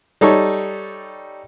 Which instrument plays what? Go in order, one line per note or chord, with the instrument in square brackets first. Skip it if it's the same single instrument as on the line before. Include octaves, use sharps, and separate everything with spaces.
[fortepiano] G3 D#4 A4 C#5